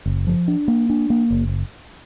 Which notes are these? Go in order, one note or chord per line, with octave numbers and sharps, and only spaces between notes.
F#1
F3
D4
A#3
D4
A#3
F#1